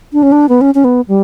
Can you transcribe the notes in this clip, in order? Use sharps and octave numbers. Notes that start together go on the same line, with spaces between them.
D4
C#4
D4
B3
C#4
C#4
B3
G3